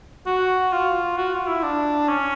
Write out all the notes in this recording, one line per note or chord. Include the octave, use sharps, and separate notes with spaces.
F#4
F4
F#4
F4
E4
D4
C#4